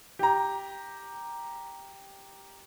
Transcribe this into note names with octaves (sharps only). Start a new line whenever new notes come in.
G4 A#5